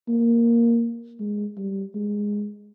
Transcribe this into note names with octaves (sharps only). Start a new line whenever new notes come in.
A#3
G#3
G3
G#3